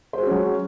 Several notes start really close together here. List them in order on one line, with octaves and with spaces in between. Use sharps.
C5 G#4 F#4 C#4 F#3